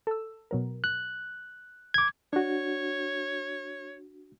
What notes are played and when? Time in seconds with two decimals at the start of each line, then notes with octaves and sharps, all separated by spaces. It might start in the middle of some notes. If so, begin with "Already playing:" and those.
0.07 A4 E6
0.51 B2 F#3 A#4
0.84 F#6
1.94 D6 G#6
2.33 D4 F#4 C#5